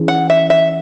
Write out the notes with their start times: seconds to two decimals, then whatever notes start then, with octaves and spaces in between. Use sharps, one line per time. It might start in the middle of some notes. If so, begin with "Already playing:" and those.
Already playing: E3 C#4 G#4
0.08 F#5
0.30 E5
0.50 E5